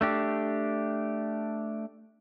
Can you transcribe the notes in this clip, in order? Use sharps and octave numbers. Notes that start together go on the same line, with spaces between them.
A3 D4 G4